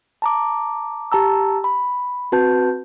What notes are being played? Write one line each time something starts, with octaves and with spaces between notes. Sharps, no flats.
A5 A#5 D6
G4 A5 A#5 E6
B5
C4 F#4 B4 A5 G6